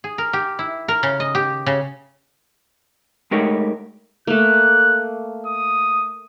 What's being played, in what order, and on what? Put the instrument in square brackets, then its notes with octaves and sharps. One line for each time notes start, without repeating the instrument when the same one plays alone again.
[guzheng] G#4
A#4
G4
E4
A#4
C#3
D#5
G4
C#3
[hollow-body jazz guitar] G#3 A3 D#4 G4 A#4 C#5
[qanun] A3 A#3 [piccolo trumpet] F#6
[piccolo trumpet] D#6